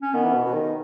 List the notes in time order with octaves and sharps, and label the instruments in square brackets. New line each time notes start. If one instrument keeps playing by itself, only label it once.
[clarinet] C#4
[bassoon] D#3 [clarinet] B3
[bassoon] E3
B2
B2
D#3